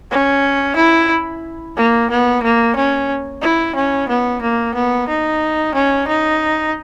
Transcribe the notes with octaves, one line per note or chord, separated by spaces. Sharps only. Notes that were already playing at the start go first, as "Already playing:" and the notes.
C#4
E4
A#3
B3
A#3
C#4
E4
C#4
B3
A#3
B3
D#4
C#4
D#4